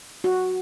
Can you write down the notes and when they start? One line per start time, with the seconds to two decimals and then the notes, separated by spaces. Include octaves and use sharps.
0.24 F#4